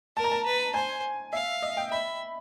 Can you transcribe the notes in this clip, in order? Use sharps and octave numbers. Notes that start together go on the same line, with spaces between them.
A#4 A5
A#5
A5
B4
C5 G#5
E5 F5
D#5
G5
E5 B5